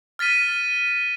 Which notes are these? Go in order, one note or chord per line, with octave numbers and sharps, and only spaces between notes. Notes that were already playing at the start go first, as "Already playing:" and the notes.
F6 A6 B6 D#7